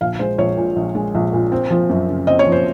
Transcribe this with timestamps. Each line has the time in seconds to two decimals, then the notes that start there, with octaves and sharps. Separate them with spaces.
0.01 A#1 F5
0.19 G#3 C5
0.38 A#1 C#5
0.57 A#2
0.76 A#1
0.95 G#3
1.15 A#1
1.33 A#2
1.52 C4
1.70 F3
1.90 F#2
2.09 C#3
2.27 C4 D#5
2.39 C#5
2.47 F3
2.52 C5